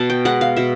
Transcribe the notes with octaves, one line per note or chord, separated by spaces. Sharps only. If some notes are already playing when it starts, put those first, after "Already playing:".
Already playing: B2 A5
G5
G#3 B3 F#5
F5
B2 E5